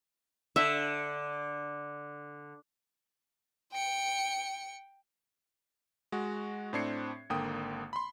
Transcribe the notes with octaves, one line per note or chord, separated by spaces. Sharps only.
D3 E5
G5 C#7
G#3 F#4
A2 C4 D4 G#6 C7 C#7
G#1 D3 A#3 G5 D#6
B5 C6